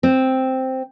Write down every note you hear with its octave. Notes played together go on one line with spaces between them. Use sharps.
C4